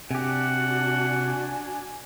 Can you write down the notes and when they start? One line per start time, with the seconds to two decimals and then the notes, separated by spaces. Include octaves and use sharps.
0.11 C3 D4 F#4 G4 F#5 G#5